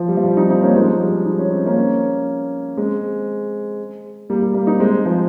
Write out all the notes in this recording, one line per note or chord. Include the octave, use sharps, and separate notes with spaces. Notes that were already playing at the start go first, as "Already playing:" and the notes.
Already playing: F3
G3
F3
G3
C4 D#4
C4 D#4
A#3 C#4
F3 G#3
G3
D#4
C#4
C4
A#3 C#4
G#3 C4
G3 A#3
G3
G3 A#3
C4 D#4
G#3 C4
F3 G#3